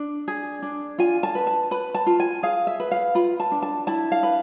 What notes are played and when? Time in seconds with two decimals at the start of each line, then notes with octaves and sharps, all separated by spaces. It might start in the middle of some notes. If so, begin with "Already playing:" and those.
Already playing: D4
0.28 G#4
0.62 D4
0.98 F4 G#5
1.23 A5
1.35 B4
1.47 A5
1.71 B4 B5
1.95 A5
2.06 F4
2.20 G#5
2.43 G#4 F5
2.67 E5
2.80 B4
2.91 F5
3.15 F4 B5
3.40 A5
3.52 D4
3.62 A5
3.87 E4 A5
4.12 F5
4.23 B4